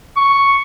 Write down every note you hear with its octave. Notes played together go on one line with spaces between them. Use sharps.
C#6